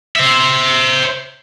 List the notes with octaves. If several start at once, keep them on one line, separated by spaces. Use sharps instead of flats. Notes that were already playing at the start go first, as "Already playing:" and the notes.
C5 E5